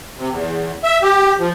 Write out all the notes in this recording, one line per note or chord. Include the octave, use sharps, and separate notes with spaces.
C3
E2
E5
G4
F3